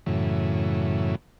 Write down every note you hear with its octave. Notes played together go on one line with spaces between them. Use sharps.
F#2 A2 C#3 E3